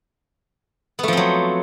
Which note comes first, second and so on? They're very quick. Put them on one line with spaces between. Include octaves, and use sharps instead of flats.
B3 A3 F3 C4 F#3